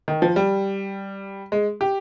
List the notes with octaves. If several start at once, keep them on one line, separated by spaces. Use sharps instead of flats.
D#3
F3
G3
G#3
G4